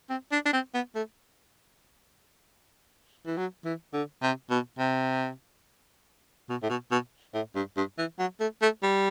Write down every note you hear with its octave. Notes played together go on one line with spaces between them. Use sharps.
C4
D4
D4
C4
B3
A3
E3
F#3
E3
D3
C3
B2
C3
B2
A2
B2
B2
A2
G2
G2
E3
F#3
A3
A3
G3